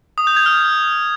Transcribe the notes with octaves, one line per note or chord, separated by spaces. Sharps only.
D#6
G6
G#6
F6